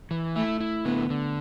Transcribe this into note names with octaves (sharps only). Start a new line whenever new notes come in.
E3
A3 E4
E4
D3 B3
D3